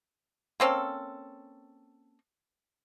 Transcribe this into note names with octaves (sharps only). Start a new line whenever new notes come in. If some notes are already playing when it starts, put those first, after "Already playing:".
A#3 C4 C#4 A4